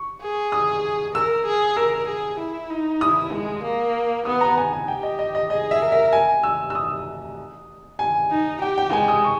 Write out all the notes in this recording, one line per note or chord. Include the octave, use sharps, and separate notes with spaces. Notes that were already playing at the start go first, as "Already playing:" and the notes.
Already playing: C#6
G#4
D#6
A#4 E6
G#4
A#4 E6
G#4
E4
D#4
E4 D#6
G#3
A#3
B3 D#6
A#5
G#5
G#5
G4 G5
D#5
D#5
D#5
G#4 D#5
E5
A#4
E5
G#5
E6
E6
D#6
G#5
D#4
G4 G5
G5
G#3 G#5
D#6
C#6